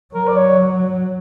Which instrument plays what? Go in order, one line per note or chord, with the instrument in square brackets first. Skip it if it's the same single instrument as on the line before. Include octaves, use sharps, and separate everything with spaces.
[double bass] F#3 [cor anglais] A#4
[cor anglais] D5
C#5